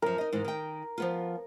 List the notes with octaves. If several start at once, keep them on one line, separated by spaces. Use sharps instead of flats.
F#2 F3 A#4
D#4 D#5
G#2 D#3 E3
D#3 G5
F3 B3 F4